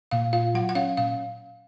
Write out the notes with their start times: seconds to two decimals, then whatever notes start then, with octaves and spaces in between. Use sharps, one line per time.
0.11 A#2 F5
0.33 F4 F5
0.55 F#3 F#5
0.69 F#5
0.75 C#4 F5
0.97 A#2 F5